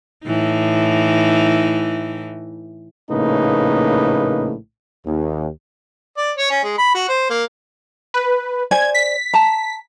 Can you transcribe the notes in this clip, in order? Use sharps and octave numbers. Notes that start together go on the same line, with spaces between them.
A2 E3 D#4
A#1 A2 C#3 A#3 D#4 B4
D#2
D5
C#5
C#4
G#3
B5
F#4
C5
A#3
B4
C5 D5 G#5 G#6
B6
A5 A#5